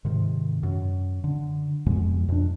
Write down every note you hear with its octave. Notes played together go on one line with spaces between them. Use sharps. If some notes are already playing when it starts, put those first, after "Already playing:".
G#2 C3 D#3
F#2
D3
F2 B2 G#3
F2 D4